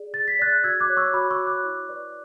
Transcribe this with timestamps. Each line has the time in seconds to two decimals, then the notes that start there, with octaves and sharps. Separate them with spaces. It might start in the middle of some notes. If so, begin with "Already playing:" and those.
Already playing: G#4 D5
0.14 G#4 A6
0.28 B6
0.39 D5 F#6 A6
0.64 F#4 E6 G#6
0.80 D6 F#6
0.89 C#5
0.97 C#6 E6
1.14 F#4 B5 D6
1.31 C#6 E6
1.39 C#5
1.47 D6 F#6
1.64 E4
1.89 B4 D5